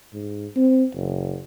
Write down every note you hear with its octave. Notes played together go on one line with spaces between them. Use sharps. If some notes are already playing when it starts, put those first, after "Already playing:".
G#2
C4
F#1